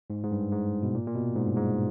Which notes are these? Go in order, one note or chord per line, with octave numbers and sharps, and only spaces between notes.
G#2
G#2
G2
G#2
B2
A#2
A#2
B2
G#2
G2
G#2